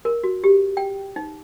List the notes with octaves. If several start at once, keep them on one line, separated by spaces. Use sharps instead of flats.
A#4
F#4
G4
G5
D#4